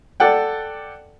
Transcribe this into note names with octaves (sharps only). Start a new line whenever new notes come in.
A4 D5 F#5 G5